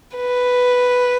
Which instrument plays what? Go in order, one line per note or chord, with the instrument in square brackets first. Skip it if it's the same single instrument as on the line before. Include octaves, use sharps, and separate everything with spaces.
[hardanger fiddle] B4